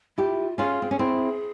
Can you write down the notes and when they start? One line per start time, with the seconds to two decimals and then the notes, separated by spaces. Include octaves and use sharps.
0.18 E4 F4 G4
0.58 C#4 F4 G#4
0.82 C4
0.91 C#4
0.99 C4 E4